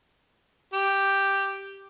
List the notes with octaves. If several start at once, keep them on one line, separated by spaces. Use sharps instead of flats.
G4